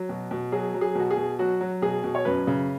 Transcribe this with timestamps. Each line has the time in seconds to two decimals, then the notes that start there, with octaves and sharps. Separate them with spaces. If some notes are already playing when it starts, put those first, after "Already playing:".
Already playing: F#3
0.09 B2
0.31 B2
0.52 F#3 G#4
0.74 F#3
0.81 G#4
0.95 B2 F#4
1.11 G#4
1.17 B2
1.39 F#3 F#4
1.61 F#3
1.82 B2 G#4
2.04 B2
2.15 C#5
2.25 F#2 B4
2.47 C#3